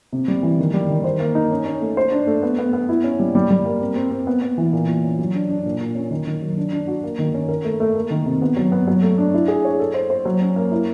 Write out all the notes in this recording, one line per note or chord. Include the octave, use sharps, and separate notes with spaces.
C3
G3
E3
D#3
G3
D#3
C5
A#3
D#4
C#4
C#4
A3
C5
D4
A3
B3
B3
B3
E4
C#4
G3
G3
G3
A#3
C4
C4
C4
B3
B3
E3
A#2
A#2
C#4
F#3
D4
D4
A#2
A#2
C#4
D#3
D#3
F#3
D4
D4
F#4
A#3
D#3
C#4
A#4
A3
A3
A#3
D#3
C3
B3
F#3
B3
F#3
A3
D4
E4
G#4
C#5
A4
C5
C5
F#3
C#4
A#3
E4